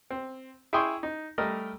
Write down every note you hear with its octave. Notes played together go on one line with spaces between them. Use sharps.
C4
E4 G#4 G5 C6 C#6 D#6
D#4
G3 A3 A#4 D#5